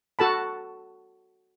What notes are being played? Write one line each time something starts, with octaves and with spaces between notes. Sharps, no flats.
F#4 A4 A5 B5